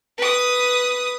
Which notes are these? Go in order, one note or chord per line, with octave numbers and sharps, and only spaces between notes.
B4 D#6